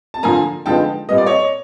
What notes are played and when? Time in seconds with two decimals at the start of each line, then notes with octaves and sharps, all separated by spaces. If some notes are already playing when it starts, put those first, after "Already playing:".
0.14 A5
0.23 D3 F3 A#3 G#5 A#5
0.66 D3 F3 G#3 B3 D#4 G5 A5
1.09 A#2 G3 B3 D#5
1.18 D5
1.26 C#5 D#5